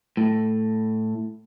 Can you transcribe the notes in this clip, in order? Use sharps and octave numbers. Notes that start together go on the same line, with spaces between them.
A2